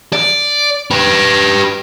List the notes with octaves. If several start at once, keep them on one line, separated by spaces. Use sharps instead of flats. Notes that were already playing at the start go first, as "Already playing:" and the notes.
D5
G4 B4